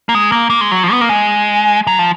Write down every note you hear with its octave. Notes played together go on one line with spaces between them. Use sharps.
A#3
G#3
A#3
A#3
G#3
F#3
F3
B3
A#3
G#3
F#3
F3